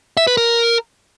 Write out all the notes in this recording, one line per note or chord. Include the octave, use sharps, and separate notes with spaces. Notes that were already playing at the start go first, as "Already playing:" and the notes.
E5
B4
A#4